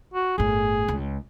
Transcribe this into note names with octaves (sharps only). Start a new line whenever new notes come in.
F#4
G1 A2 G#4
C#2